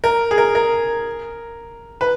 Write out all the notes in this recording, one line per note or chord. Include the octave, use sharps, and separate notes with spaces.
A#4
G#4
A#4
A#4
B4